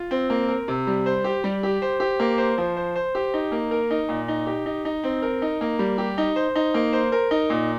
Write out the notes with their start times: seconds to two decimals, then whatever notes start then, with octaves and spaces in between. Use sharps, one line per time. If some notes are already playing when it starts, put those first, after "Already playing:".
Already playing: F4
0.11 C4
0.30 A#3
0.49 A#4
0.68 C3
0.87 G3
1.06 C5
1.24 G4
1.44 G3
1.63 G4
1.82 C5
2.00 G4
2.20 A#3
2.38 C5
2.58 F3
2.76 C5
2.95 C5
3.15 G4
3.34 D#4
3.52 A#3
3.71 A#4
3.91 D#4
4.09 A#2
4.28 D#4
4.47 G4
4.66 D#4
4.85 D#4
5.04 C4
5.22 A#4
5.42 D#4
5.61 A#3
5.79 G3
5.98 G4
6.18 D#4
6.36 C5
6.55 D#4
6.74 A#3
6.93 C5
7.12 A#4
7.31 D#4
7.50 A#2